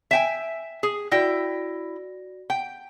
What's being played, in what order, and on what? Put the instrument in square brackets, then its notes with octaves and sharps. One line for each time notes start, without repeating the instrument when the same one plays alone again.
[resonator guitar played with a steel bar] E5 G5 G#5 [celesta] B6 E7
[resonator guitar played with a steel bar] G#4
[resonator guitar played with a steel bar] E4 G5 [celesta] F#4 D5 A#6
[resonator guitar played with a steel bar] G5